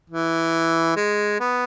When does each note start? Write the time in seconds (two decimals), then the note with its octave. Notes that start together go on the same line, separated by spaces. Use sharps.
0.10 E3
0.96 G#3
1.40 B3